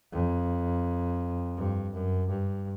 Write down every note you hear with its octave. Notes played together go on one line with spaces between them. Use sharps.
F2
G2
F#2
G2